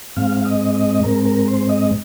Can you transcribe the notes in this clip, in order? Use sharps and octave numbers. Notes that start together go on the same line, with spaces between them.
G#2 G#3 C4 F5
F5
D#5
D#5
G#2 G#3 C4 A#4
A#4
C5
D#5